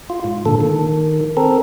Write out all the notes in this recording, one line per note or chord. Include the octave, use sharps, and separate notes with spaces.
F4
G#2
A#2 D3 A4
D#3
C4 A4 A#4